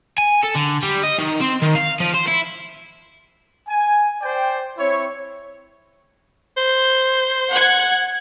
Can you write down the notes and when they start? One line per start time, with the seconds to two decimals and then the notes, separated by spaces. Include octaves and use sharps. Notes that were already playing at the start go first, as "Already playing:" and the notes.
0.18 G#5
0.44 A4
0.56 D3
0.83 G3
1.03 D#5
1.18 D#3
1.41 C4
1.62 D#3
1.75 F5
2.00 F3
2.14 C5
2.27 E4
3.68 G#5
4.21 C5 D5 G5
4.78 C4 E4 C#5
6.57 C5
7.50 F#5 F#6 G#6